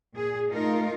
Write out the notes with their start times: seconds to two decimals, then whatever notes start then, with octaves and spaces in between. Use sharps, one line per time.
0.14 A#2 G#4
0.49 A3 D#4 F4 A#4